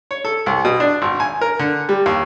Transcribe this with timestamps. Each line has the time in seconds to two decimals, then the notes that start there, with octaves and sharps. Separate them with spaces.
0.11 C#5
0.25 A4
0.46 C2
0.65 B2
0.80 D4
1.02 G#1
1.20 G#5
1.41 A#4
1.59 D3
1.89 G3
2.06 D#2